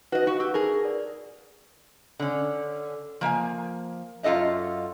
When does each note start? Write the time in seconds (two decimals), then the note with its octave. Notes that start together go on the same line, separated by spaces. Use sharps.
0.12 D#4 F#4 B4 D#5
0.27 F#4 F5 F#5
0.40 G4 E6
0.54 G#4 A#4
0.85 D5
2.20 D3 C#4
3.21 F3 A#3 E5 G#5
4.23 F#2 F4 A4 D#5 E5